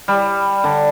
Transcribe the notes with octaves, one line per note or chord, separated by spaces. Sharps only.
G3
D3